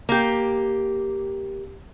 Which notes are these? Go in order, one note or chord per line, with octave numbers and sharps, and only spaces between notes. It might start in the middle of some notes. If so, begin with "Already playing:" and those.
A#3 G4